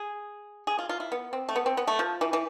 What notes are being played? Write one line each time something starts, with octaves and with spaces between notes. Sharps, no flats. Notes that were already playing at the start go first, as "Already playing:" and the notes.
Already playing: G#4
G#4
F4
F4
E4
B3
C4
A3
B3
C4
B3
A3
F3
E3
E3